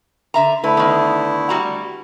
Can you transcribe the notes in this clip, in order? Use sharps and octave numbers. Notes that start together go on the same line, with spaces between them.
D3 E5 A#5
D3 A3 E4 B4
D#3 B3
G3 F#4 A#5